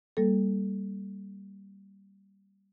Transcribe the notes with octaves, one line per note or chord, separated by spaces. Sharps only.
G3 A#3 A4